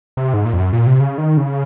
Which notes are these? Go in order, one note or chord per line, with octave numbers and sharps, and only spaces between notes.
C3
G#2
A#2
F2
F#2
A#2
C3
C#3
D#3
C#3